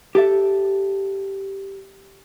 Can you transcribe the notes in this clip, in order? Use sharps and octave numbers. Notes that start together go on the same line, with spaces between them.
G4 A4 E5